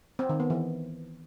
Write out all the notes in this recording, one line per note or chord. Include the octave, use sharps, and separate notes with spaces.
C4
D#3
B3
E3